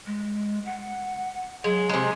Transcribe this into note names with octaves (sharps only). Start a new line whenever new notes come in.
G#3
F#5
F#3 G#3
C3 G#3